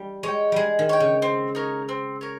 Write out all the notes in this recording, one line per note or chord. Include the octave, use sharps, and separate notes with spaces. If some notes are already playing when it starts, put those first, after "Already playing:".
Already playing: G3
G#3 C#5 G5
G3 G#3 G#4
D#3
C#5 G5
C#3
C4
D#4 A#4 C#5
C4
A#4 C#5